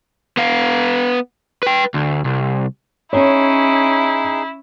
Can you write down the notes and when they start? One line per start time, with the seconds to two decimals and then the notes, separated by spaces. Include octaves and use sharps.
0.37 B3 F5
1.63 B4 G5
1.94 D2
2.25 C2
3.13 C#4 D#4 E4 G#4 C#5